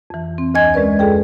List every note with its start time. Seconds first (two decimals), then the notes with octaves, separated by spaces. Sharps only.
0.10 F2 E3
0.38 C4
0.54 D2 D#5 G#5 G#6
0.74 G#3 C#4 A#4 B4 D5
0.99 F2 G#4 A4 G5